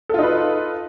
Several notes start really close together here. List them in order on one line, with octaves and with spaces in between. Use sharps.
A4 F4 D#4 B4